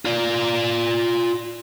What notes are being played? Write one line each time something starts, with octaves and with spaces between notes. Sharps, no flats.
F4 D5